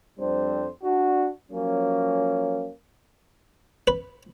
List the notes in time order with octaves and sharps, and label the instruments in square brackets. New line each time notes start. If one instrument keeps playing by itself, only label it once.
[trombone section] F2 G3 C4 D4 C5
D4 F#4
F3 F#3 A#3 C#4
[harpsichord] B4